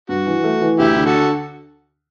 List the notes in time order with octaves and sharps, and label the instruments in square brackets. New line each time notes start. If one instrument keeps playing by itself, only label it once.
[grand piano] G2 [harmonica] F#4
[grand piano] E3
A3
E3
[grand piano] D2 [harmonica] E4 G4
[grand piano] D3
[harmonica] F#4 A4